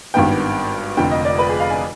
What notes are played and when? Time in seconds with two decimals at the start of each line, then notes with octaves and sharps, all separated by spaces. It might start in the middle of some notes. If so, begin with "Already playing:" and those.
0.14 G#1 G2 D#3 B3 G5
0.97 F1 F2 D3 G5
1.11 D#5
1.25 D5
1.39 B4
1.49 G#4
1.60 F5
1.70 G#5